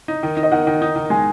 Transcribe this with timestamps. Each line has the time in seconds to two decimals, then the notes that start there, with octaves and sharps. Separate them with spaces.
0.08 D#4
0.23 D#3
0.37 D#4
0.43 D#5
0.52 D#3 F#5
0.67 D#3
0.82 D#4
0.95 D#3
1.10 G#3 G#5